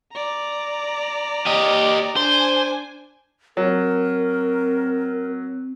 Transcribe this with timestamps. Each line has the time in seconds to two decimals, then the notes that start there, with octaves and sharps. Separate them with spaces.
0.13 D5 A#5
1.46 G4 D#5
2.16 D4 C5 G#5
3.57 F#3 C4 A#4